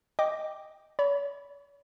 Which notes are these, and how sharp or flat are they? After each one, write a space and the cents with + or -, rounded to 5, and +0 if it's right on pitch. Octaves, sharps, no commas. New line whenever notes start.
D#5 +0 G5 +0 D6 +0
C#5 +45 B5 +0